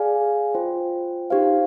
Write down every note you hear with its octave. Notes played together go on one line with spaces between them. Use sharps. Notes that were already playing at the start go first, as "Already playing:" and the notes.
Already playing: G#4 D5 F5 G#5
F4 C5 G5
D#4 G4 C5 F5